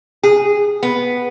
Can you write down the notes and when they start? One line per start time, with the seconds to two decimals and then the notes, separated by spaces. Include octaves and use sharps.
0.23 G#4
0.83 B3